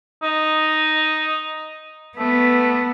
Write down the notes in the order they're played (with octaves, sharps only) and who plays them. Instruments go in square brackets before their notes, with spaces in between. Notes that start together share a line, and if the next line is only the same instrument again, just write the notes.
[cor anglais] D#4
[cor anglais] A3 [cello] B3